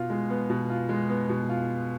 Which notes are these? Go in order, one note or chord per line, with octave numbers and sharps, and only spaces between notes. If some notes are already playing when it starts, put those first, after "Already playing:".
Already playing: B2 F4
G#3
B3
B2
F4
G#3
B3
B2
F4